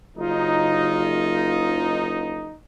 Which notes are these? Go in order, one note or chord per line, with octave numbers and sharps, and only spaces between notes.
F#1 D#4 F4